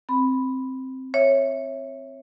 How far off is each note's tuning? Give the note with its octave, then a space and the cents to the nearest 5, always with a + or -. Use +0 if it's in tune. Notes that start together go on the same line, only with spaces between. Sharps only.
C4 +0 B5 +0
C#5 -15 E5 +0